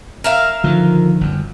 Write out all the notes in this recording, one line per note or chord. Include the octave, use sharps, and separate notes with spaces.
A#4 E5 F5
D3 D#3 F3
G1 F#2